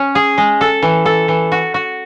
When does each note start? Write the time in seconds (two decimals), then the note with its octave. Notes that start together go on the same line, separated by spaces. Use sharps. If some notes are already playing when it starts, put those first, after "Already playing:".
Already playing: C#4
0.15 G#4
0.38 G#3
0.61 A4
0.83 E3
1.06 A4
1.28 E3
1.52 F#4
1.74 F#4